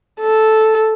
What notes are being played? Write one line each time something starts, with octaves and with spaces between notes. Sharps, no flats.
A4